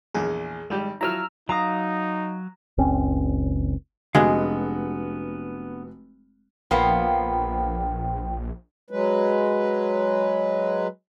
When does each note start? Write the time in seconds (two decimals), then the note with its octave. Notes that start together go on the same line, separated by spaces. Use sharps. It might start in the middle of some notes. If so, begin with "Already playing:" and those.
0.14 A#1 E2 G#4
0.70 G#1 G3 G#3 G4
1.01 F3 F#3 E4 A#5 E6 F6
1.49 F#3 D#4 F5 A#5 D#6
2.78 F#1 C#2 C4 C#4
4.15 F1 G#3 B3 D4 F#4 F5
6.71 A#1 F3 A#3 B3 G5
8.90 F#3 G#3 B4